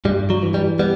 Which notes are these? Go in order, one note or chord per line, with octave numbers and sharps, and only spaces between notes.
G2 G3
F#3
E3
G3
G3 B3